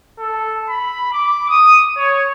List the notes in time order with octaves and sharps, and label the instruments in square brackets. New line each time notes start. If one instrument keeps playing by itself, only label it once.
[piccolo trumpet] A4
B5
D6
D#6
C#5